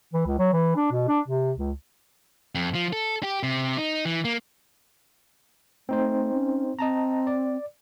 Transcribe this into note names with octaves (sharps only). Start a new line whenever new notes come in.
E3
C#2
F#3
E3
D4
B2
D4
C3
C#2
F2
F3
A4
G4
C3
D#4
E3
A#3
A3 C4 D#4 C5
C#4
C4 D#5 A5 A#5
D5